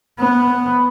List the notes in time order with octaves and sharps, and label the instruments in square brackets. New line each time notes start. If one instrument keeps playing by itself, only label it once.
[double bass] B3